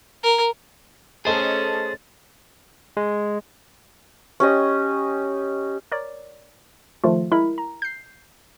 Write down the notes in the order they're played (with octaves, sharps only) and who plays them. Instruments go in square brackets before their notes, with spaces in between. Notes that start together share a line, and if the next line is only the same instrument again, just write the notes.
[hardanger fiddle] A#4
[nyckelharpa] A3 C#4 [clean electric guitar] G#4 C5 [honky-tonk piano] A4 D#5 D#7 [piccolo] A6
[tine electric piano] G#3
[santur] C#4 G4 D#5
[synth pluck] A#4 C#5 D5
D#3 F3 A3 F4
G#3 E4 A#4 B5
A#5
G6 C7